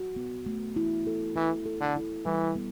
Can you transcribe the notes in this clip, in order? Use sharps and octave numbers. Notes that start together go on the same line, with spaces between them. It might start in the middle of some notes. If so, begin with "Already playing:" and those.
Already playing: F#4
B3
A3
E4
A4
E3 E4
A4
D3
E4
E3 G3
B3